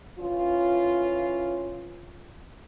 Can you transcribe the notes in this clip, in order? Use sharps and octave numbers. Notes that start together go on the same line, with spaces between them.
E3 C#4 F4